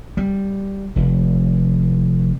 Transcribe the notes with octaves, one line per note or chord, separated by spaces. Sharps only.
G3
F1